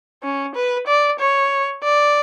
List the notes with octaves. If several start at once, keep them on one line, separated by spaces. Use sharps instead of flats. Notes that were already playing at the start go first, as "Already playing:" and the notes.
C#4
B4
D5
C#5
D5